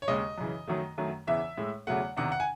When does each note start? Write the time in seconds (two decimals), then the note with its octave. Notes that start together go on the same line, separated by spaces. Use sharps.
0.02 C#5
0.08 D#2 C#3 G#3 D#5
0.38 F#2 C#3 E3
0.67 F#2 D#3 F#3 A3
0.98 F#2 D#3 F#3 A3
1.27 E2 C#3 E3 E5
1.58 A2 G#3
1.87 E2 C#3 F#3 A3 F#5
2.17 E2 C3 D#3 F#5
2.32 F#5
2.40 G#5